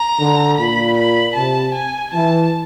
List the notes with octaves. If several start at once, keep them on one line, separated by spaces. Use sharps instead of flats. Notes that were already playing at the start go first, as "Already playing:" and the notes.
Already playing: A#5
D3
A#2 B5
B5
C3 A5
G#5
E3 A5